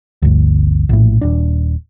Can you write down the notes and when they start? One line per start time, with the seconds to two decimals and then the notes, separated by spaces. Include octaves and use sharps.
0.22 G1 D2
0.89 A#1 A2
1.21 D#1 D4